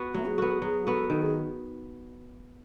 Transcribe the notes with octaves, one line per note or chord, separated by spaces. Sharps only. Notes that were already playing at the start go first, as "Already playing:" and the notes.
Already playing: B3 F#4
F#3 A3
G#4
B3 F#4 A4
G#4
F#3 G#4
B3 F#4 A4
D#3 A4
G#4